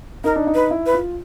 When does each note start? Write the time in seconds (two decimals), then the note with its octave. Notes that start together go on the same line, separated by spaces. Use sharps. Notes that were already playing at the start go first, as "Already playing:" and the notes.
0.24 D#4 A#4
0.36 D4
0.47 D#4
0.55 B4
0.71 E4
0.86 B4
0.94 F4